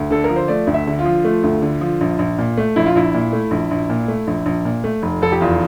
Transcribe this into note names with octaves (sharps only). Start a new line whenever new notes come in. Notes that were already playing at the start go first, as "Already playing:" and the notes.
Already playing: D2
D3 A4
A#4
F3
C5
A3 D5
D2
E5
D3
F4
F3
A3
D2
D3
F3
A#1
A#1
A#2
A3
A#1 E4
F4
A#1 E4
A#2
A3
A#1
A#1
A#2
A3
A#1
A#1
A#2
A3
F1
F1 A4
G4
E2 F4